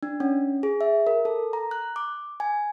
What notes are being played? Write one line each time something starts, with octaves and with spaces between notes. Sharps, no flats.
D4
C#4
G#4
E5
A#4
A4
A#5
F#6
D6
G#5